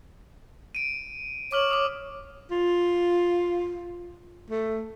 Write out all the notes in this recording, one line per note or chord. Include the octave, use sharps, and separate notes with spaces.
D7 D#7
C#5 D6 F6 F#7
D6 D#6
F4
A3